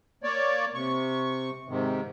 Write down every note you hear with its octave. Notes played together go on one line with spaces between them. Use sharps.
A#3 C#5 D5
C3 C#6
G#2 C3 D#3